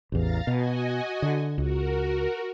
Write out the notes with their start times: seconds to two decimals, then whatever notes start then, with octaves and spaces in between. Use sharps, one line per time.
0.12 A1 E2 F5 A#5 A6
0.47 B2 F#4 D#5 G#5
1.22 D3
1.58 C#2 F#4 A#4